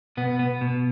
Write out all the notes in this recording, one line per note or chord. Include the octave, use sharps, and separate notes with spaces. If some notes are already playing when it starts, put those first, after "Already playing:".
B2 B3
B3
B2